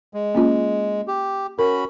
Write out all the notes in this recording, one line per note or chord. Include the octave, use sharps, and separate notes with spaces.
G#3
A#3 C#4 F4
G4
C#4 F#4 A#4 B5